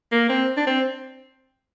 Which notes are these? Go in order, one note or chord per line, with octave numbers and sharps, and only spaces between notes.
A#3
C4
D4
C4